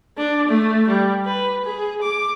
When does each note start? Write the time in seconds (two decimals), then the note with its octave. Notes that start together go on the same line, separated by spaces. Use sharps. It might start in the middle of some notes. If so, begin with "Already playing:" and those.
0.18 D4
0.48 A3
0.88 G3
1.25 B4
1.65 G#4
2.02 D6